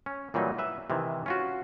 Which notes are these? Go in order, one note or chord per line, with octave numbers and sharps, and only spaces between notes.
C#4
A#2 E3 F#3 G3 D#4
B4 E5
C3 D#3 E3
C#4 F4 F#4